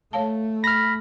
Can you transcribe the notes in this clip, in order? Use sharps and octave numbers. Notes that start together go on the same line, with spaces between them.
A3 C#5 F5 A5
B5 F6 A#6